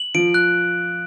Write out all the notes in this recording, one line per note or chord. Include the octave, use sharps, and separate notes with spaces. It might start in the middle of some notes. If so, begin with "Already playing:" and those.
Already playing: F#7
F3 D7
F#6